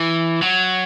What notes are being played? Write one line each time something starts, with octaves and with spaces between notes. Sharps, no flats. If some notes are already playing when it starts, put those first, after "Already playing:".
Already playing: E3
F#3